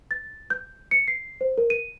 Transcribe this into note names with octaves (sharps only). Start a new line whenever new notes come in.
A6
G6
C#7
C7
C5
A#4
D#7